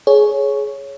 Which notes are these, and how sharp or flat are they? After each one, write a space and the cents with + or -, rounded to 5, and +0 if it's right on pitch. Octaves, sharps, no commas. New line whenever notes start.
G#4 +20 C#5 +0